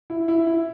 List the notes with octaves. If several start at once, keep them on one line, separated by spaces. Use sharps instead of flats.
E4
E4
E4